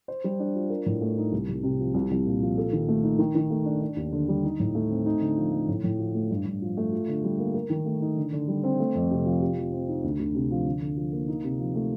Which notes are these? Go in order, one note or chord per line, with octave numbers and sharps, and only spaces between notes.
C5
G3
D4
F4
A#4
A2
A3
D#4
C2
C2
C3
F3
C2
C2
A#2
F3
A4
D#3
A3
D#4
D#3
D#3
A3
D4
D4
D#2
D3
G3
D#4
A2
A3
C4
D#4
D3
F3
A3
A2
A2
F3
A3
G2
G2
F3
A3
F4
D3
G3
A#3
A#4
D#3
A3
D#4
D3
D3
G3
C4
A3
F2
C3
F3
G4
F3
C4
D#4
D2
D2
C3
F3
D3
D3
F3
A#3
D#4
C3
F3
A3